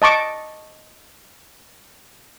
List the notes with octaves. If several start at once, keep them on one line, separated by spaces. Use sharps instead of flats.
D#5 A5 C#6 D6